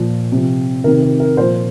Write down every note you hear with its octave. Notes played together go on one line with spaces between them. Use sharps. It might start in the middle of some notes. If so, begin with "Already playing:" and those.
Already playing: A#2 F3
C3 F3
C3 D#3 A#4
A#4
A#4
A#2 F3 C5